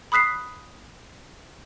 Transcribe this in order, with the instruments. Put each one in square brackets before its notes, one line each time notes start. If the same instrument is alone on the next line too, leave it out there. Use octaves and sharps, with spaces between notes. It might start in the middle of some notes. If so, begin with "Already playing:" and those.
[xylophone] B5 D#6 F#6 B6 C7